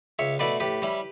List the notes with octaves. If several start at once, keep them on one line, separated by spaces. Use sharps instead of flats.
C#2 C#5 E5
B2 A3 E4 B4 D5
A2 G4 B4
G3 C#4 E4